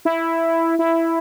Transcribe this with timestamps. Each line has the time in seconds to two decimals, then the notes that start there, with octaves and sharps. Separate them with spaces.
0.05 E4
0.79 E4